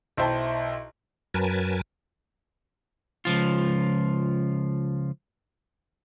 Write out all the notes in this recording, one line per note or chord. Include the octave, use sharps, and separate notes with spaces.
B1 E4 C5 E5 G5 A5
F#2 F#3 A#4 B4 G#5 A5
C#2 F3 F4